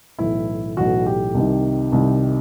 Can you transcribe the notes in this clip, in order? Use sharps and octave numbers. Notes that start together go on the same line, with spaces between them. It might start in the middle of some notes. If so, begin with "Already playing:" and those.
B1 A2 E3 E4
B1 A2 E3 F#4
G4
C2 C3 D#3
C2 C3 D#3